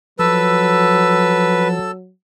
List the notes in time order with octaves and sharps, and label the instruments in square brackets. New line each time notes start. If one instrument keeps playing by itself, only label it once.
[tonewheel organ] F3 [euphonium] F#3 [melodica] A4 E6 [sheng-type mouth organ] B4